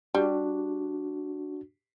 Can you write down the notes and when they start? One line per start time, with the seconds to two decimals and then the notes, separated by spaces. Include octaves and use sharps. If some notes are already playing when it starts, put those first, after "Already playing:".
0.15 G3 D4 F#4